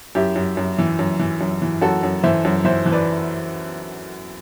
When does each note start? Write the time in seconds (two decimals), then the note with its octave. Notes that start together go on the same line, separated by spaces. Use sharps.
0.15 F#2 E4 G4
0.36 F#2
0.57 F#2
0.78 E3
0.99 F#2
1.19 E3
1.41 F#2
1.62 E3
1.82 F#2 F#4 A4
2.03 F#2
2.24 E3 C5 E5
2.45 F#2
2.64 E3 C5 E5
2.86 E3
2.92 B4 D5